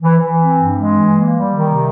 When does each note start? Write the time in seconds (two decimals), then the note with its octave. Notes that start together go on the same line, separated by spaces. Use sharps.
0.02 E3
0.20 E3
0.38 C4
0.57 G2
0.75 G#3
0.93 E3
1.11 A#3
1.31 G3
1.49 D#3
1.67 C3